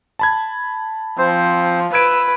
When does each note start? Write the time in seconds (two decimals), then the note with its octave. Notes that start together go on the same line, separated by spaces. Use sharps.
0.19 A5 B5 G#6
1.18 F3 C4 C5
1.93 B4 E6 G6 G#6 D7